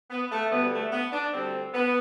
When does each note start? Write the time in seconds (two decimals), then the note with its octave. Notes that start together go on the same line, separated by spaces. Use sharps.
0.10 B3
0.31 A3
0.51 D2 D3 G3 B3
0.71 A3
0.91 B3
1.12 D4
1.32 D2 D3 G3 C4
1.73 B3